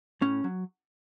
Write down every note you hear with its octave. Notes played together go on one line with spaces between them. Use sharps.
A2 C#4
F#3